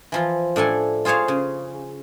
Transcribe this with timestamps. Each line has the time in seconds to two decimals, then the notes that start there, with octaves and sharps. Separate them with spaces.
0.12 E3 F3 F4
0.56 A2 D4 A4 G#5
1.05 F4 G#4 C5 C#5 F5
1.28 C#3